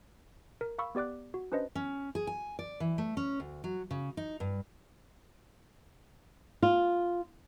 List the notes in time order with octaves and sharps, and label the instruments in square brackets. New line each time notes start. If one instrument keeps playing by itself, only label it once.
[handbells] A#4
F5 B5 C#6 E6
B3 G4 D5 D6 F#6
F#4
C#4 D4 B4 C5 D#5
[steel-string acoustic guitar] C#4
G#4
G#5
D5
E3
A3
C#4
D2
F#3
C#3
D#4
G2
[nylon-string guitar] F4